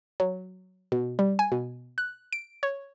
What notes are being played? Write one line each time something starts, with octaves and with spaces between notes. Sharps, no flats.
F#3
B2
G3
G#5
B2
F#6
D7
C#5